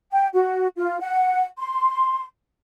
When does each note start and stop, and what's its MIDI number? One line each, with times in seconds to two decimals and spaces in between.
0.13 0.28 79
0.34 0.67 66
0.77 0.98 65
1.00 1.45 78
1.58 2.23 84